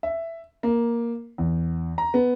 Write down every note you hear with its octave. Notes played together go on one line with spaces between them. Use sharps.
E5
A#3
E2
A#5
B3